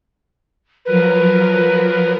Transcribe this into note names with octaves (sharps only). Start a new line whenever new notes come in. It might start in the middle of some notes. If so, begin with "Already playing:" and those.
F3 F#3 A#4 B4